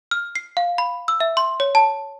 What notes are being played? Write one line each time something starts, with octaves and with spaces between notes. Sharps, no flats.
F6
C7
F5
B5
E6
E5
C6
C#5
A5